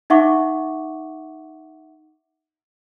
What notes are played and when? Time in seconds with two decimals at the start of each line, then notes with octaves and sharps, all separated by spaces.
0.10 D#4 E5 F#5 C#6 D6